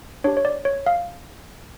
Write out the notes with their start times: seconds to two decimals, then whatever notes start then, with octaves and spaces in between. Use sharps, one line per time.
0.24 D4 G4 C#5
0.37 C#5
0.45 D5
0.65 C#5
0.86 F5